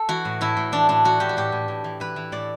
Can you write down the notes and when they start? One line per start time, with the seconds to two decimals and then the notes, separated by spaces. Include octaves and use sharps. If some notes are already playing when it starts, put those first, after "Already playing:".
Already playing: A4
0.09 E3 F#4
0.25 A2
0.41 A2 E4
0.57 A2
0.72 E3 D4
0.89 A2 D4
1.04 E3 F#4
1.20 A2 G4
1.29 F#4
1.37 A2 G4
1.52 A2
1.68 A2
1.84 E3
2.00 E3 B4
2.16 E3
2.32 A2 D5